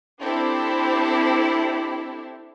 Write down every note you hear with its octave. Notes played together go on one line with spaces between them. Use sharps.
C4 D4 E4 G4 A4